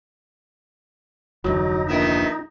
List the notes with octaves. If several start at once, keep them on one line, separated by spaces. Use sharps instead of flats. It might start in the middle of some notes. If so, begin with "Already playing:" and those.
F1 D2 E3 F#3 D#4
A#1 D#3 B3 E5